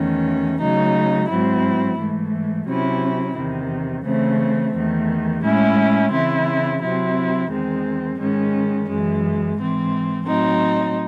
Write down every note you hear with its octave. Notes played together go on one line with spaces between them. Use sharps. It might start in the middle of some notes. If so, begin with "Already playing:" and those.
Already playing: E2 D#3 A3 C#4
C#3 F#3 A3 D#4
G#2 F#3 C4 E4
G#2 E3 A3
C3 F#3 C#4 E4
E2 C3 D#3
C#3 E3 A3 C4
E2 D#3 A3
A2 G#3 C#4 E4
C#3 E3 C4 E4
C3 F#3 C4 E4
E2 D#3 G#3 C4
G#2 D#3 G#3 C#4
F#2 E3 G#3
G#2 E3 C4
A2 F#3 C4 D#4